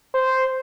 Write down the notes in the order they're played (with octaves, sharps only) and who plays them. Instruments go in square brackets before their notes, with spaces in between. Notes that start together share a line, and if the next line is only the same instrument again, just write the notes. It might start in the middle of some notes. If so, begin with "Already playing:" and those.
[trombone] C5